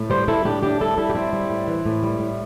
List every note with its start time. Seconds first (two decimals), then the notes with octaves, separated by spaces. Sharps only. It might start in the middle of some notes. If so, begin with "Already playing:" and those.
Already playing: A2
0.10 G3 G4 C5
0.28 G3 E4 A4
0.45 A2 D4 G4
0.63 A2 D4 G4
0.81 G3 E4 A4
0.97 G3 E4 A4
1.10 G4
1.15 A2 C4 E4
1.33 G3
1.50 A2
1.68 E3
1.86 A2
2.03 G3
2.20 A2